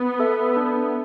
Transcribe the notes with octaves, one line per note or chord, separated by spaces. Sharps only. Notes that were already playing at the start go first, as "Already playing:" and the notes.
Already playing: B3
A4 E5
D4